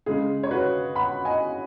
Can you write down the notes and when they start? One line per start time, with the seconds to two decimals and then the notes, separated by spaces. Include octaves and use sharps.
0.06 C#3 G#3 G#4
0.43 C#5
0.51 F#4 B4
0.95 F#5 B5
1.25 D#5 G#5